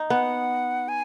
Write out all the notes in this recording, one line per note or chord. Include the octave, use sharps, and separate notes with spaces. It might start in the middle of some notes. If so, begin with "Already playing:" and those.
Already playing: D#4
B3 F#5
G#5